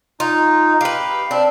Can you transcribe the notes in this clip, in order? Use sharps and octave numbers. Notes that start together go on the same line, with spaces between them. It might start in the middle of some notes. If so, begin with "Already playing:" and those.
D#4 F4
G4 B4 F5
C4 D4